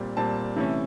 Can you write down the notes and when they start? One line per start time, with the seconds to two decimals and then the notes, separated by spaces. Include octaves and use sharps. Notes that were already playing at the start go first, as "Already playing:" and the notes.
Already playing: A#2 G3 C4
0.17 A#2 G3 C4 A5
0.56 C3 E3 A3 C#4